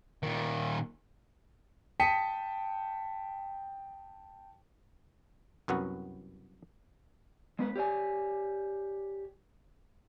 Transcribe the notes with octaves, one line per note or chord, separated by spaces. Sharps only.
A#2 D#3
G5 A5 D#6 B6 C#7 D#7
C2 F#2 B3 F#4
G#3 B3 B4
G4 C#5 D5 G#5